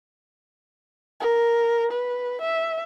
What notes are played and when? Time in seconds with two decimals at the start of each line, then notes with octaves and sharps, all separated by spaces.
1.20 A#4
1.91 B4
2.41 E5